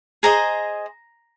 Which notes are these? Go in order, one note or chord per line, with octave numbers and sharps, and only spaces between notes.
G#4 C5 D#5 A#5